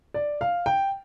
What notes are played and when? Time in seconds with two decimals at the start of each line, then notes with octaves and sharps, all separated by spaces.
0.14 D5
0.41 F5
0.66 G5